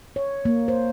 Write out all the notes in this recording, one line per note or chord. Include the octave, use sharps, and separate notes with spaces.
C#5
A#3
C5